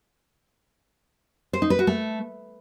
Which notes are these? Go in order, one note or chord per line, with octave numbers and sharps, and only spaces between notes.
C5
D#4
B4
F#4
A3